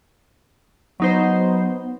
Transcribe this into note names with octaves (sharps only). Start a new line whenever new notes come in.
F#3 B3 D#4 C5